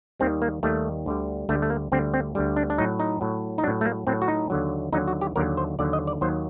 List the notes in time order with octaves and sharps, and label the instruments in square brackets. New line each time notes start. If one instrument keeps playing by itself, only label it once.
[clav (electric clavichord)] D#2 D#3 G3 C4
A#3
D#2 D#3 G3 A3
D2 D3 G3
D2 D3 G3 A3
A3
A#3
D2 D3 G3 C4
C4
D2 D3 G3
D4
D4
A2 F#3 D#4
D#4
A2 F#3
D#4
A2 F#3 D4
A3
A#3
A2 F#3 C4
F#4
D#4
D#2 D3 F#3
D#2 D3 F#3 D#4
F#4
G4
D#2 D3 F#3 A#4
C5
D#2 D3 F#3 D5
D#5
D5
D#2 D#3 F#3 C5